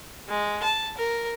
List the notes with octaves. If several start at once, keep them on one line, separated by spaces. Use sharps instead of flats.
G#3
A5
A#4